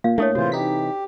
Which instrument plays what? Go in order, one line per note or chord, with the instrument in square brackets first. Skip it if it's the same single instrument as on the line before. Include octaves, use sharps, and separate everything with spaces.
[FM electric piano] A#2 [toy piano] F5
[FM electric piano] A2 A#3 [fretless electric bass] A3 [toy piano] D4 A4 C#5
[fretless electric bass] C3 E3 [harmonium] F4 C5 [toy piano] F#4
[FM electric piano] D#4 B6 [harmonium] G4